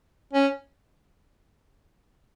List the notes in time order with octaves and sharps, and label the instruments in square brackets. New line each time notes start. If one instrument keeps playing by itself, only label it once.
[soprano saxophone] C#4